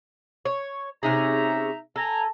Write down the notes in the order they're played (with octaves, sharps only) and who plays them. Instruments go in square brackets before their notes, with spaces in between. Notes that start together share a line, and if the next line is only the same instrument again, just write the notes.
[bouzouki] C#5
[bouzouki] C3 C#4 G#4 [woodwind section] D#4 E5 A#5
[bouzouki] A4 [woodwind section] G#5 A#5